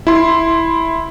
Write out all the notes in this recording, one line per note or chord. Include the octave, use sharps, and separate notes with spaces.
E4 C6